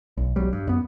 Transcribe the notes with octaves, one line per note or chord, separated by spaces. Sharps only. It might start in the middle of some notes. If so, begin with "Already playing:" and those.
B1
E1 B1 F#3 G3
G2
F#2 B3